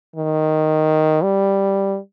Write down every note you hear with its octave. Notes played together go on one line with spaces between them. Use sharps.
D#3
G3